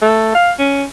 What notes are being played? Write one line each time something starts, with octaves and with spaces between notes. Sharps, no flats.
A3
F5
C#4